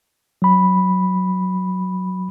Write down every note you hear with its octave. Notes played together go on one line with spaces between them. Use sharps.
F#3 B5